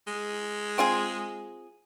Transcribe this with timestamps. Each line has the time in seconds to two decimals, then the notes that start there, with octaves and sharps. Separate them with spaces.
0.07 G#3
0.78 C4 F4 G#4